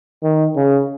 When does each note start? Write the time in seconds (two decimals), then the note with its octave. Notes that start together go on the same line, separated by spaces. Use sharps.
0.23 D#3
0.56 C#3